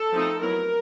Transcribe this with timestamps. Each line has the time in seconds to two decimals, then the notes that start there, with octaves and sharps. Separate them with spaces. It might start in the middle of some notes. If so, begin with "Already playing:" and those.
Already playing: A4
0.13 F3 A3 C4 D#4
0.41 F#3 B3 E4 A#4